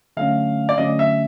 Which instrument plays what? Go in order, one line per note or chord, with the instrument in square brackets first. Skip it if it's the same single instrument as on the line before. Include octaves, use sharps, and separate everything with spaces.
[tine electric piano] D3 F#3 A3 C#4 [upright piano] F5
[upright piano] D5
[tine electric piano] D3 F#3 A3 C#4 [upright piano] D#5
[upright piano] E5